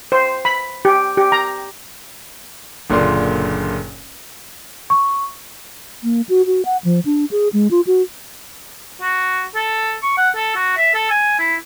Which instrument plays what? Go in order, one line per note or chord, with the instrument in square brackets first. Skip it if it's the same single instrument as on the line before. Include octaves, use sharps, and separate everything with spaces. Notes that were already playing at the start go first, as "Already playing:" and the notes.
[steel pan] C5
B5
G4
G4
A#5
[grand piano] F#1 A#2 D3 D4 C6
[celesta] C#6
[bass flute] A#3
F#4
F#4
F#5
F3
D4
G#4
G#3
F4
F#4
[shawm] F#4
A4
C#6
F#5
A4
F#4
E5
A4
G#5
E4